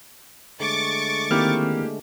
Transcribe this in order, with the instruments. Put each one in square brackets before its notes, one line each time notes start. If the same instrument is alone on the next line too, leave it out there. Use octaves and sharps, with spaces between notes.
[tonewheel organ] D3 G#3 A3 [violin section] C#6 D6 A6
[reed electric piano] D#3 C4 F6 [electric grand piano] A#3 E4 G4